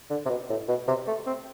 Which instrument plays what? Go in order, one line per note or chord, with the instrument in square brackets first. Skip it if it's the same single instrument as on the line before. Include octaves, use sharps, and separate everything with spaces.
[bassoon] D3
C3
B2
A2
B2
C3
A3
C4